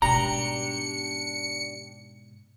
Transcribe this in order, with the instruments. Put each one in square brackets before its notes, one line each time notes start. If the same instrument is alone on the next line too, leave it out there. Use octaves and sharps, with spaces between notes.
[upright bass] G#2 B2 [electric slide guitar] D4 G4 [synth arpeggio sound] A#5 [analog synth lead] C#7